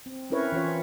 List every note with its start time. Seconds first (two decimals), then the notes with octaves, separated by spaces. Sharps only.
0.06 C4
0.30 C4 C#4 E4 A#4 B4 C#5
0.52 E3 C#4 F4 C#5